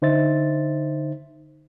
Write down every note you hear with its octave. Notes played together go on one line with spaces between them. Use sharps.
D3 D#4 C5 E5 A6